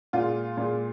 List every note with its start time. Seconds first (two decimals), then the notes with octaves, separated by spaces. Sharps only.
0.13 A#2 F4
0.18 G#3
0.57 A#2 G#3